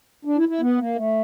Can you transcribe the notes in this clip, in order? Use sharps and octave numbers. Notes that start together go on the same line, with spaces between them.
D4
E4
E4
B3
A#3
A3